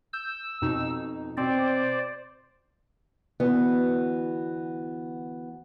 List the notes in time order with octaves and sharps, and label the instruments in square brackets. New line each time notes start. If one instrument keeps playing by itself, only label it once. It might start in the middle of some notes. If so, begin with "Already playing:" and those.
[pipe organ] E6 [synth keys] G6
[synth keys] F2 B2 D#4
[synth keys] B2 C4 [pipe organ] C5 D5
[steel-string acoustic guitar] D2 E3 B3 F#4